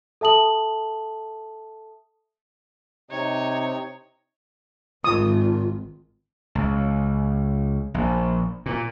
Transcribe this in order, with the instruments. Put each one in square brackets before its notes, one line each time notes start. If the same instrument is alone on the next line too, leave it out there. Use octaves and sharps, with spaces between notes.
[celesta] A4 E5 A5 D#6 F#7
[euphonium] C3 [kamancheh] D#4 [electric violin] C#5
[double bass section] G#1 [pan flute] F4 [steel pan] D#6
[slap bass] C#2
A#1
A#2